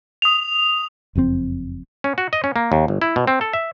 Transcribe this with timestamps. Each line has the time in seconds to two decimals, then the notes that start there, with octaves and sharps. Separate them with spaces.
0.22 D#6 F7
1.15 F#1 F2 A#2 C4
2.04 C#4
2.18 F#4
2.33 D#5
2.44 C#4
2.56 A#3
2.72 D#2
2.88 G1
3.02 E4
3.16 B2
3.27 C4
3.41 A4
3.53 E5